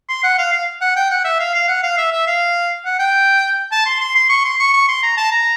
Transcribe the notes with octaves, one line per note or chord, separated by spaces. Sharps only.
C6
F#5
F5
F5
F#5
G5
F#5
E5
F5
F5
F#5
F5
E5
E5
F5
F#5
G5
A5
C6
C6
C6
C#6
C6
C#6
C#6
C6
A#5
A5
A#5